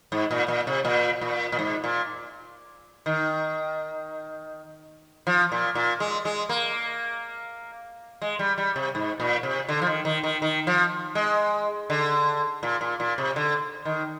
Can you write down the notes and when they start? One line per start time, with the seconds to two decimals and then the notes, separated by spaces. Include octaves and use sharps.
0.12 G#2
0.31 A#2
0.48 A#2
0.67 C3
0.85 A#2
1.21 A#2
1.52 A#2
1.59 G#2
1.84 A#2
3.06 D#3
5.27 F3
5.52 A#2
5.75 A#2
6.00 G#3
6.25 G#3
6.49 A#3
8.22 G#3
8.39 G3
8.58 G3
8.76 C3
8.95 G#2
9.20 A#2
9.43 C3
9.68 D3
9.82 F3
9.87 D#3
10.05 D#3
10.23 D#3
10.42 D#3
10.67 F3
11.15 G#3
11.90 D3
12.63 A#2
12.81 A#2
13.00 A#2
13.18 C3
13.36 D3
13.85 D#3